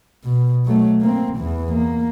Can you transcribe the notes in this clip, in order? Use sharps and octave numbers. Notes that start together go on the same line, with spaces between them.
B2
F#3 A3
A#3 C4
E2 E3
A#3